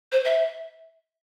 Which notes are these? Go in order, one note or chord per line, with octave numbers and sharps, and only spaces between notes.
C5
E5